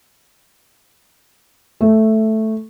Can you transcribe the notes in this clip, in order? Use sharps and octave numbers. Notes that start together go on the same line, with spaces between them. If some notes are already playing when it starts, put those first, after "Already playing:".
A3